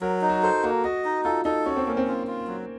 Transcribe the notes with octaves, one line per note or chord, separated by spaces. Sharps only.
F#3 A#4
D#4
F#4
A4 C5
A#3 F#4
F#4 D#5
D#4
F4 A4
D#4 A4
C#4 F#4
C4
A#3 C#4
C4
F4
F4
F#3